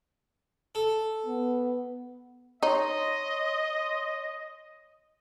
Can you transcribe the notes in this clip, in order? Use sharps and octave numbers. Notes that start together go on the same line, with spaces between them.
A4
B3
D#4 C#5 D#5 C6